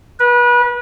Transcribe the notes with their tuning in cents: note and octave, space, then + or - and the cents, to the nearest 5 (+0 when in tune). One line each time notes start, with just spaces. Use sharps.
B4 -30